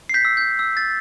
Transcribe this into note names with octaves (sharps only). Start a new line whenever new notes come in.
C7
G6 B6
E6
G6
E6
A6